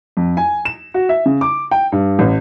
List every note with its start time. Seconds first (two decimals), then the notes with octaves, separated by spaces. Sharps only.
0.17 F2
0.37 G#5
0.65 E7
0.94 F#4
1.09 E5
1.26 C#3
1.41 D6
1.71 G5
1.92 G2
2.19 A1